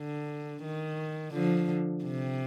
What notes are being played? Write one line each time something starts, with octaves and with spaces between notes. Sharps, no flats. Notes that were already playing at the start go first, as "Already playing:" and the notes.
Already playing: D3
D#3
D3 F3
C3